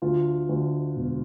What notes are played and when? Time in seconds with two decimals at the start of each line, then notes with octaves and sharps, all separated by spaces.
0.02 D2 F4
0.49 D2
0.96 E1